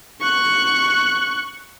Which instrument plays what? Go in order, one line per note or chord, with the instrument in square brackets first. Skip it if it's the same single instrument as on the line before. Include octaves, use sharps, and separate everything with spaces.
[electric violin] C#6 F#6